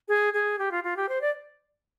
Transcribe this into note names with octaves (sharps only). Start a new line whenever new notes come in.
G#4
G#4
G4
F4
F4
G4
C5
D5